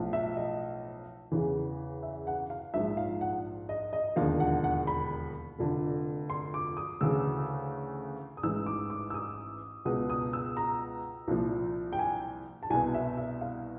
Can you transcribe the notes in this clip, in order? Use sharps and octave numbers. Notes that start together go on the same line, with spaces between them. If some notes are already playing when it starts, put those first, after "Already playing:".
Already playing: B1 A2 F3
E5
D#5
E2 C#3 E3
E5
F#5
F5
A#1 G#2 F3 E5
F5
F#5
D#5
D#5
E1 D#2 D3 F3 F5
F#5
F#5
B5
F1 F2 D3
C6
D6
D#6
D2 C#3 E3 E6
D#6
A1 G#2 E3 E6
D6
D6
E6
D#6
C#2 B2 D#6
D#6
E6
A#5
C2 A#2 F3
G5
G#5
A5
C2 B2 G#5
E5
E5
F5